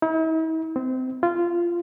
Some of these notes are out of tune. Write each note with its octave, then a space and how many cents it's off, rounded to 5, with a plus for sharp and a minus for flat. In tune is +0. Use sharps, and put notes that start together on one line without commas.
E4 -45
C4 -25
F4 -15